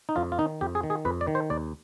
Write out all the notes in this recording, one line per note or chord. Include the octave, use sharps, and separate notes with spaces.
D#4
F2 F4
F4
D#3 D#4
F2 G4
G#4
D#3
G#4
F2 B4
D5
D#3
C5
D#2 D5